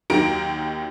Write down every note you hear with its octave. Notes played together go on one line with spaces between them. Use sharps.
D#2 D#3 F#3 A#5 D7